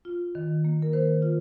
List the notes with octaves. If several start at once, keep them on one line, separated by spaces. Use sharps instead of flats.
F4
D#3
A#3
A#4
D#3 C5
F4